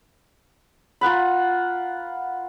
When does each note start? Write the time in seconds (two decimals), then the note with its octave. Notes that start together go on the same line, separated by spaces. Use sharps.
1.01 F4 A#4 F#5 B5